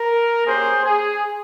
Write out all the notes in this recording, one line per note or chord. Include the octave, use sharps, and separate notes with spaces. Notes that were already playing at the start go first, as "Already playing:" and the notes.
Already playing: A#4
A#3 C#4 G4 G#4 C5
G#4